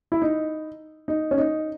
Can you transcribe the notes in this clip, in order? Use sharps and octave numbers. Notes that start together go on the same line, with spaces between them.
E4
D#4
D#4
C#4
D#4